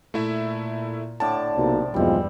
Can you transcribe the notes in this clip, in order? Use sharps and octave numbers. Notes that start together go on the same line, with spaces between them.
A#2 A3 E4 E5
A2 D3 A5 D6
B1 C3 A#3
B1 E2 G2 F3 G3 G#3 C4